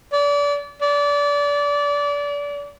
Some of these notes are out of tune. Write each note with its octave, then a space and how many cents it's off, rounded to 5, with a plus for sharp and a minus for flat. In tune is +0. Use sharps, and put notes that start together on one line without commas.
D5 -30
D5 -30